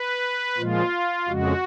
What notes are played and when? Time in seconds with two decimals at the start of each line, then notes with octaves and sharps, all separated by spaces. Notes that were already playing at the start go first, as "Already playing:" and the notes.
Already playing: B4
0.58 A#2 F3 G#3 F4
1.28 F2 C#3 G#3 F#4